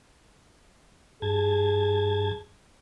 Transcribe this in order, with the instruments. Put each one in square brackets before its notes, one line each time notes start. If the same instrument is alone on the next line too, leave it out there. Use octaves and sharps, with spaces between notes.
[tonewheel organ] G2 A5 G#6 [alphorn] G#4